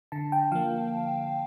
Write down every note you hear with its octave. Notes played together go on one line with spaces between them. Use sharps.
D3 A5
G5
F3 A#3 F5